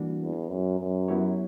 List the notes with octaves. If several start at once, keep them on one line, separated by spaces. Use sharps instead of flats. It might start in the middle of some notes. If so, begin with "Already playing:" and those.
Already playing: E3 G3 A#3 D4 F#4
E2
F#2
F#2
F#3 B3 E4 G4 C#5